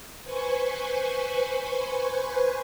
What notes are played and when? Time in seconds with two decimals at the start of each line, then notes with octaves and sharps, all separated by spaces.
0.24 B4 C5 G#5 C#6